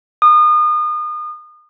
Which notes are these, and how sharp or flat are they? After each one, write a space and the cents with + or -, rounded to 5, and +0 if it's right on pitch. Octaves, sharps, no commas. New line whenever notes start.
D#6 -35